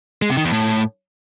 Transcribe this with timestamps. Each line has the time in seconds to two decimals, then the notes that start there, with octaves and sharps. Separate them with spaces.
0.22 G#3
0.29 C3
0.37 D#3
0.45 E2
0.52 A2